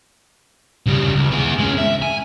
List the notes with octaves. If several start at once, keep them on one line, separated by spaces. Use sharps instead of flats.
C#3 G3
C#2
B3 G#4
G#3 C#4
E5
G#5